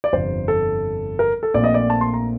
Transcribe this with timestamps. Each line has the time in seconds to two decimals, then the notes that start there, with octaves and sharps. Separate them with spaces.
0.04 D5
0.13 G1 F2 C3 C5
0.48 A4
1.19 A#4
1.43 A4
1.54 A#1 A#2 A3 C4 D5
1.64 D#5
1.74 D5
1.90 A5
2.01 C6
2.14 A#5